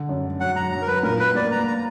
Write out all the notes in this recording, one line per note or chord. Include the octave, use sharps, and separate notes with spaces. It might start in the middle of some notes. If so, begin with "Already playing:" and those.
Already playing: D3
F#2
F#3 F#5
A#5
F#3 A#5
A#4
B4
A#2 A#4
B4
A#3 D5
A#5
A#5